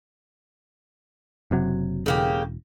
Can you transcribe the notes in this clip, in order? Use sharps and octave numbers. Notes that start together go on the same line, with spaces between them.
F#1 C3 F#3
E1 C#3 A#3 G4